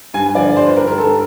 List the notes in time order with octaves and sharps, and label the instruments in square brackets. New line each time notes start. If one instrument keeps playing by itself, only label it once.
[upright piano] G2 G#5
D3 F3 D5
G2 C5
B4
D3 G3 A#4
A#4
G2 A4